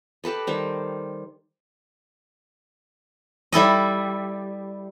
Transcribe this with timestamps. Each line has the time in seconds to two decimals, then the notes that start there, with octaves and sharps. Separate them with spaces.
0.24 G4 A4 B4 D#5
0.47 D#3 G3 C5
3.52 G3 E4 A4 D#5